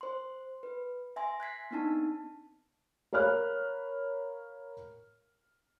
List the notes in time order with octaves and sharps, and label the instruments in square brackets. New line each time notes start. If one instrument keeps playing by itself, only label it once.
[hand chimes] C5 C6
B4
E5 G#5 C6 A#6
F#6 G#6 B6 C7
B3 C4 D4 D#4 A5
[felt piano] A#4 C#5 F5 B5 F6 F#6